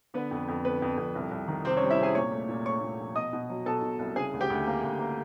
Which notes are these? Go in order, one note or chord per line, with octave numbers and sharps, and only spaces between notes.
D3 B3 B4
F2
F2
D3 B3 B4
F2
F2
C2
C2
D#3
C3 C4 C5
C#4 C#5
G3
E4 E5
C3 G#4 G#5
A#2 C#5 C#6
A3
A#2
A3 C#5 C#6
A#2
F3
B2 D#5 D#6
B2
F#3
B2 A4 A5
B2
C2
C#3 G#4 G#5
D2
G4 G5
D2
A#3
D2
A#3